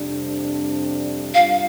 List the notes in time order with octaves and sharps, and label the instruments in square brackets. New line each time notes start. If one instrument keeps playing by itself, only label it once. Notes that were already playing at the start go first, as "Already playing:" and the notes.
Already playing: [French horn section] F2 C3 G3 D4
[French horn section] G2 G3 D4 F4 [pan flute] F5